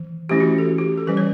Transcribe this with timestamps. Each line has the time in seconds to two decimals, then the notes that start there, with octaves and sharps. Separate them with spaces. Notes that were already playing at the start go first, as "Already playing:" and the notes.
Already playing: E3
0.29 E3 A3 C#4 E4 G4
0.40 F#4
0.58 A4
0.78 G4
0.97 A4
1.07 E3 G3 C#4 B4
1.17 C#5